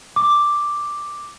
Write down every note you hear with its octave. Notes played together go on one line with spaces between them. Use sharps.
D6